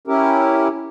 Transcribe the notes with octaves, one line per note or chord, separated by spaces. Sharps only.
C#4 E4 G4 A#4